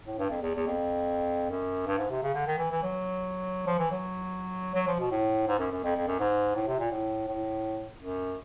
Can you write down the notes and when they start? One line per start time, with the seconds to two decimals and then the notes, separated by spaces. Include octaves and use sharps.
0.06 A2
0.18 G2
0.30 F2
0.42 E2
0.55 E2
0.66 F2
1.50 F#2
1.86 G2
1.98 G#2
2.10 C3
2.23 C#3
2.34 D3
2.47 D#3
2.58 E3
2.71 E3
2.82 F#3
3.66 F3
3.79 E3
3.91 F#3
4.75 F#3
4.87 F3
4.99 B2
5.11 A2
5.47 G#2
5.59 F#2
5.71 F#2
5.84 F2
5.96 F2
6.07 F#2
6.19 G#2
6.55 A2
6.67 C3
6.79 A#2
6.91 A2
7.28 A2
7.99 F#2